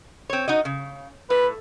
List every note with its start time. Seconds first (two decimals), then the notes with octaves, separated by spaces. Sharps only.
0.30 C4 C#5
0.48 D#4 F#4 D#5
0.65 C#3
1.30 A2 B4